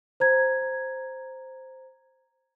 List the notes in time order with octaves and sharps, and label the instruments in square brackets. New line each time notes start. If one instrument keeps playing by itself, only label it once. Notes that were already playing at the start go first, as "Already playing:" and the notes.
[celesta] C5 A#5 G#6